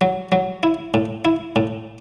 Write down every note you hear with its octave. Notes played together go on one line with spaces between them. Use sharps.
F#3
F#3
E4
A2
E4
A2